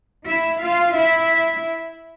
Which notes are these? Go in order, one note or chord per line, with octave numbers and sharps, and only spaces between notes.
E4 E5
F4 F5
E4 E5